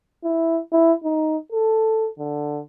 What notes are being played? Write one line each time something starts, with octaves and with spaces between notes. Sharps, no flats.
E4
E4
D#4
A4
D3